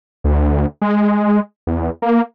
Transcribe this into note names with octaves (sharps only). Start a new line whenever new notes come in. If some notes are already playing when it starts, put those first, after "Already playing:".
D2
G#3
E2
A#3